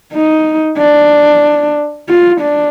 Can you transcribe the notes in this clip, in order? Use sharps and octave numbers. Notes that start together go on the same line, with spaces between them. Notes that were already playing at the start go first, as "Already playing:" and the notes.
D#4
D4
F4
D4